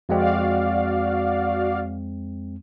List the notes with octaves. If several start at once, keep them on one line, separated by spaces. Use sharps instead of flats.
F2 G#3 C4 F#4 D5 F5